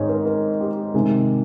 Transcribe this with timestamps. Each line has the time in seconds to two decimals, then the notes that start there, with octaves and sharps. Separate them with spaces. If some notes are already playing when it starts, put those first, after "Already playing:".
Already playing: G#2 D#3 G#3 C4 D#4 C#5 D#5
0.09 A#4
0.25 A#4
0.61 G4
0.94 C3 D#3 G#3 D#4